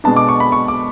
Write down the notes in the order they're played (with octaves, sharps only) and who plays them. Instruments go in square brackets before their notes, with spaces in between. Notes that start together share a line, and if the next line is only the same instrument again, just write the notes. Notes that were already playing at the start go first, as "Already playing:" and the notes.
[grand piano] B2 G#3 B3 D4 A5
D6
C#6
B5
C#6
D6